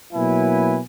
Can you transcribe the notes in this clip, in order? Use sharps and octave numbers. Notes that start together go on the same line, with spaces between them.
B2 F#3 A#3 E4 B4 G#5